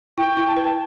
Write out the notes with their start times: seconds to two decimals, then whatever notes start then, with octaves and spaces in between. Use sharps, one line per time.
0.18 E4 G5
0.37 E4
0.47 A5
0.55 B4 G5
0.64 A5